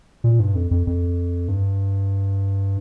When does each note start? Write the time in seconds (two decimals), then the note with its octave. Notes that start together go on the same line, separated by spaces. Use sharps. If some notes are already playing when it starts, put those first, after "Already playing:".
0.24 A#2
0.40 G2
0.55 F2
0.71 F2
0.87 F2
1.48 G2